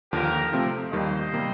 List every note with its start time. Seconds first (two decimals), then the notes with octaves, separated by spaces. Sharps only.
0.12 D#2 D3 F3 G4 A#4
0.52 C3 F3 A3 C4 F4
0.92 D#2 D#3 G3 A#3 C5 D#5
1.34 C3 G3 A#3